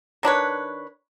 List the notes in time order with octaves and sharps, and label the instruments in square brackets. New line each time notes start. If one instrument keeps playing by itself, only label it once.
[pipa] D#3 D4 B4 C#5